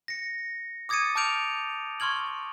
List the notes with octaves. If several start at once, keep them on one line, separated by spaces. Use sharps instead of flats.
A#6 C#7
D6 D#6 G#6 A6 C#7 D#7
A5 D6 F6 G6 D7 F7
C6 C#6 F6 G#6 F#7